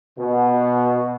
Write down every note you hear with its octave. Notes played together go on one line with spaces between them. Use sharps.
B2